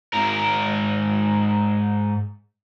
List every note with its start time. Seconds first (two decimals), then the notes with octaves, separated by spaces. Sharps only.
0.13 G#2 A#4